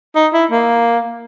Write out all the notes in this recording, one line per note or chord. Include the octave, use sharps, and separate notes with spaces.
D#4
E4
A#3